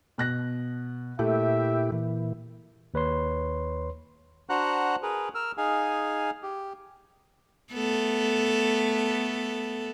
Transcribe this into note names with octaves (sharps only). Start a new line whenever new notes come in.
B2 F#6 A#6
A#2 A3 E4 G4 E5
A#2 E3
D#2 B4 C#5 C6
D4 F#4 C5 F#5 A#5 F#6
G#4 A#4 B4
A#4 E6 F6
D#4 G#4 F5 G#5
G4
A3 B3 A4